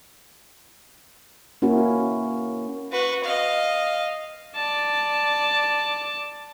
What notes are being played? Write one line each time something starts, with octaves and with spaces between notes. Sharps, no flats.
A#3 C#4 E4 F#4
F#4 B4
D#5 F5
D5 A5